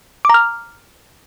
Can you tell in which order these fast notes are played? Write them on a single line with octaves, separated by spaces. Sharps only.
D6 A#5 F6